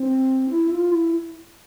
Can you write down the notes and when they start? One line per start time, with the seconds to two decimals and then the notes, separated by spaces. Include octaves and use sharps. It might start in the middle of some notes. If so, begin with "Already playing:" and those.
Already playing: C4
0.50 E4
0.71 F4
0.91 E4